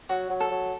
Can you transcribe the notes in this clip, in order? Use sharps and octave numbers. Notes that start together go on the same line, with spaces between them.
F#3 F#4
F#3
A4
F#3